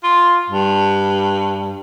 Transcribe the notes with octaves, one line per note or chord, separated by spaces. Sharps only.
F4
G2